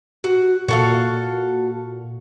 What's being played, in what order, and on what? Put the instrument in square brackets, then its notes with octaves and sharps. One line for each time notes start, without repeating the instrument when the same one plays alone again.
[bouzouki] F#4
[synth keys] A#2 [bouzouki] F#4 A4 F5